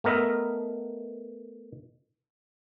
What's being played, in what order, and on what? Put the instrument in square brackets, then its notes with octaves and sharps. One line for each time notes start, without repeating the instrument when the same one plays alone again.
[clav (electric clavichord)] A3 B3 A#4 D#5 E5